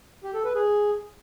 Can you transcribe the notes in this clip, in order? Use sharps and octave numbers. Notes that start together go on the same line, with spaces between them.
G4
A4
B4
G#4